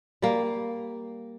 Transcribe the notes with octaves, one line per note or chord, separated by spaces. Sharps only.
G3 A#3